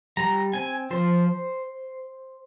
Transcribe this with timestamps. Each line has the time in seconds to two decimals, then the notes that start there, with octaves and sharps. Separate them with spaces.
0.17 G3 A#5
0.53 C4 G#5
0.91 F3 C5